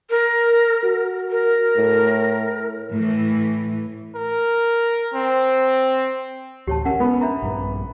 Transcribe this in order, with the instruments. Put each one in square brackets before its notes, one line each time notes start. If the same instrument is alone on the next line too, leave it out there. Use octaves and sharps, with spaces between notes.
[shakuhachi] A#4
[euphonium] F#4
[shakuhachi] A#4
[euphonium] A2
[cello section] A2 E3
[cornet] A#4
C4
[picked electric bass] A1 D2 [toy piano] G4 C#5 A5
[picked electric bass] C#4 [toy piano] A#4 F#5
[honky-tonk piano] B3
[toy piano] D4 E5 A#5
[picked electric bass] A#1 G2